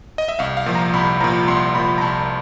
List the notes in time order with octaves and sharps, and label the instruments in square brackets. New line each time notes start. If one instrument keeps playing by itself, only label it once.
[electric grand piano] D#5
E5
C2 F5
F5
A#2 F3
A#5
C2 B5
F3 A#5
A#2
C2 C6
A#2 F3 B5
A#5
C2 A5